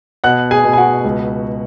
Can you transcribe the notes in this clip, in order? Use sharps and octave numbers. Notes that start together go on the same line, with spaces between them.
B2 F#5 F#6
G#4 G#5
B2
G#5
F#4 F#5
C#2